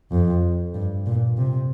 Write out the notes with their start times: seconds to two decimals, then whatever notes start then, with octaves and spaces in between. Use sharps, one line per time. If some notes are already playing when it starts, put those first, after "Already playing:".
0.11 F2
0.74 G2
1.06 A#2
1.37 C3